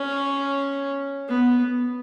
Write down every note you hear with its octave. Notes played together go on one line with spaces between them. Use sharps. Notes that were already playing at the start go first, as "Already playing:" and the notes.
Already playing: C#4
B3